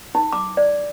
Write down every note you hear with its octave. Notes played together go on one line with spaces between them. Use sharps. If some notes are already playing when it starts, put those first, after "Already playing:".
D#4
D6
D5